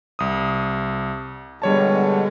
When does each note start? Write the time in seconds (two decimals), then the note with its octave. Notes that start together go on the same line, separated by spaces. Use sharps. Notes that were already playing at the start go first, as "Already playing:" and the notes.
0.19 C2 D#6
1.62 B2 D3 G3 G#3 C#5 A5